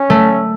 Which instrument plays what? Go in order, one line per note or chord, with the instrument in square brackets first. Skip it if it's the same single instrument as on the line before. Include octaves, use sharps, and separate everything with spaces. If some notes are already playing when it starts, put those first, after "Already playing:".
Already playing: [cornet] C#4
[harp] A3